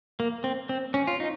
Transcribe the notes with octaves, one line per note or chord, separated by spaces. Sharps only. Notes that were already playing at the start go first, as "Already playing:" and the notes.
A#3
C4
C4
C#4
F4
D#4